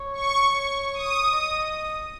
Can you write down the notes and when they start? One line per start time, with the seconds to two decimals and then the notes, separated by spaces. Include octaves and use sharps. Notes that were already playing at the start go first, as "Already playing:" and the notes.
Already playing: C#5
0.13 C#6
0.54 C#5
0.93 D#6
1.32 D#5